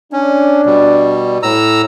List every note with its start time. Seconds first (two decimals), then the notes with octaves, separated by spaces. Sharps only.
0.12 C#4 D4
0.66 B2 G3
1.43 A2 A#5 E6